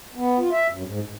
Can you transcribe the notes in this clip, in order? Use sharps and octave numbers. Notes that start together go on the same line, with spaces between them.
B3
F4
E5
F#2
G#2
G#2